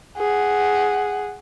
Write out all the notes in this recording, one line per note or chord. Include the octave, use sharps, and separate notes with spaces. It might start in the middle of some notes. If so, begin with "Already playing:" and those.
G#4 F#5